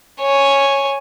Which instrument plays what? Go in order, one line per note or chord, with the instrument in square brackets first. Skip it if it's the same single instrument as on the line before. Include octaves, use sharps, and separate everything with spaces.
[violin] C#5 G#5